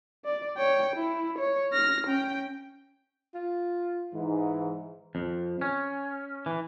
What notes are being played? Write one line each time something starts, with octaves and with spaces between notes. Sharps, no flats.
D5
C#5 G5
E4
C#5
F6 A#6
C#4 G5
F4
G#2 E3
F2
C#4
E3